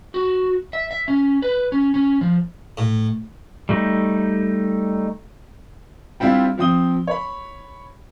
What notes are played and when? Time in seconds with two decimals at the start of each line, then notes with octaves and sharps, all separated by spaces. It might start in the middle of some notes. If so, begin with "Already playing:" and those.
0.14 F#4
0.73 E5
0.91 E5
1.08 C#4
1.42 B4
1.72 C#4
1.94 C#4
2.21 F3
2.77 A2
3.69 G3 A3 D#4
6.20 G3 C4 D4 E4 F4 G4
6.58 F3 C4 D#6 G7
7.07 C#5 B5